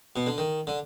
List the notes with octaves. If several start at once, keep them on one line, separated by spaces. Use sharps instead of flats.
B2
D3
D#3
D3